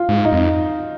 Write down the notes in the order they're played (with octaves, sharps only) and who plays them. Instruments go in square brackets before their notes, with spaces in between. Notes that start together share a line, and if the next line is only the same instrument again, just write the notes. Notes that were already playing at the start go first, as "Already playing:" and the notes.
Already playing: [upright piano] F4
[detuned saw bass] G#2
[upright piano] D#4
[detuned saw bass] F2